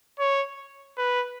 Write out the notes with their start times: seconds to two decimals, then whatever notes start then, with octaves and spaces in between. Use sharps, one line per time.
0.19 C#5
0.98 B4